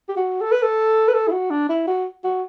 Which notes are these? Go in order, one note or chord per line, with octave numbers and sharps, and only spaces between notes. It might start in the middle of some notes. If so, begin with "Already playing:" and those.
G4
F#4
A4
B4
A4
B4
A4
E4
F#4
D4
E4
F#4
F#4